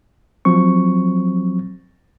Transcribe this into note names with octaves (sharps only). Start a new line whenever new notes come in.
F3 F#3 C4 C#6